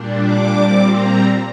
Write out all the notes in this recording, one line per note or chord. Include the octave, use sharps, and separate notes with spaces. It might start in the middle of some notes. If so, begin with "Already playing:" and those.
Already playing: A#2 G3 D4
D6
A#2 G3 C4
A#5